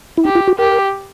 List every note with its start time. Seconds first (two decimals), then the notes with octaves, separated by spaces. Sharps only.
0.17 E4
0.25 D#4 G4
0.35 F4
0.48 F#4
0.58 G4 A#4